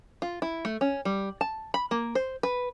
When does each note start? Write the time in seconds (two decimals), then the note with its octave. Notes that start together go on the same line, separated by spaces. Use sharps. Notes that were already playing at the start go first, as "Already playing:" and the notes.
0.22 F4
0.42 E4
0.65 A3
0.81 C#4
1.05 G3
1.41 A5
1.74 B5
1.91 A#3
2.15 C5
2.43 B4